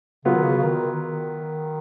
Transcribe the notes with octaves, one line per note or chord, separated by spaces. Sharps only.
C#3 F#3 B3 F4
D#3
C#3
C#3
D#3
D#3